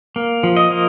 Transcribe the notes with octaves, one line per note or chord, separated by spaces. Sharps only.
A#3
F3
D#5
A#3